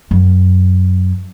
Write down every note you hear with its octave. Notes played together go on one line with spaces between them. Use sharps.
F#2